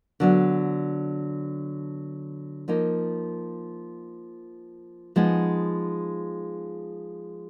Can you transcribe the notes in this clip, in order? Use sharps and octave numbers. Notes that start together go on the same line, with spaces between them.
D3 F#3 B3 D4
F3 A#3 D#4
F3 G#3 B3 D#4